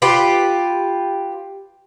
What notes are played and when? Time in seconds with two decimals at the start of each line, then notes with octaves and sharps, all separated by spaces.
0.02 F4 G4 B4